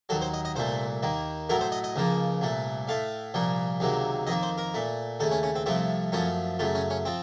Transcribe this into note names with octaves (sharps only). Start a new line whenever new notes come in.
D#2 D#3 F#3 A4
C5
D#5
D#5
C2 A#2 A3 C5
D#2 D#3 A#3
A2 F#3 A3 A#4
C5
D#5
D#5
C#2 C#3 F3 A#3
C2 A#2 A3
A2 A3 F5
C2 A#2 F3 A#3
C#2 C3 D#3 F#3 A#3
F2 D#3 A#3 D#5
C5
A#4
A#2 A3
D#2 C#3 A3 A4
C#4
C#4
C4
C2 C3 F3 A3 C4
F#2 F3 A3 C#4
F#2 C#3 A3 F4
C#4
C#4
F3 C4